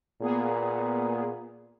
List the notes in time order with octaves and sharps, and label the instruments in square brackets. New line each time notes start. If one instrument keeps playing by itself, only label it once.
[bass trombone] A#2 [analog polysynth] A#3 B3 G#4